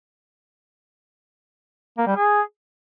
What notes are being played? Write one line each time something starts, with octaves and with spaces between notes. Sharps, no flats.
A#3
G3
G#4